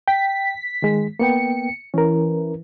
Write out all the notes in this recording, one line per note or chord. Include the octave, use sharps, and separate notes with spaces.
G5 B6
D#3 G#3
A#3 B3 G5 C#7
E3 C#4 A#4